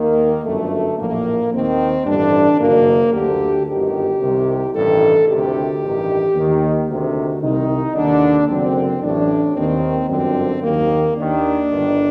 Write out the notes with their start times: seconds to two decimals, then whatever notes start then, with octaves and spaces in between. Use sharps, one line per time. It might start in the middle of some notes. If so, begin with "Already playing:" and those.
Already playing: D#2 D#3 A#3
0.45 G1 F#2 D3 A3
0.99 A#1 A2 A#3
1.53 D#2 D#3 C4
2.06 A1 G2 D3 D4
2.60 F#1 F#2 D#3 A#3
3.14 D2 D3 G4
3.67 G1 F#2 D#3 G4
4.21 C2 C3 D#3
4.74 A1 G2 D#3 A4
5.28 D2 C3 D#3 G4
5.81 A1 G2 D#3
6.35 D#2 D#3
6.88 D2 C3 D#3 F#4
7.42 C2 C3 D#3 D#4
7.96 D#2 D3 D4
8.49 F#1 F#2 D3 C4
9.02 A1 A2 D4
9.56 D#2 D#3 C4
10.10 G1 F#2 D3 C4
10.63 D#2 D#3 A#3
11.17 D#2 D#3 D4
11.71 G1 G2 D#3